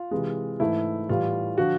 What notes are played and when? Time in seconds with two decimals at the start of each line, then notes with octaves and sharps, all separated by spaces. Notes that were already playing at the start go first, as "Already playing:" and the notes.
Already playing: F4
0.11 C3 E3 G#3
0.60 G#2 E3 A3 E4
1.09 A2 E3 G3 F4
1.58 D3 F3 F#4